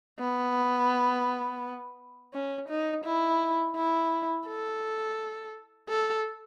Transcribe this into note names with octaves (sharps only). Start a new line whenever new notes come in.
B3
C#4
D#4
E4
E4
A4
A4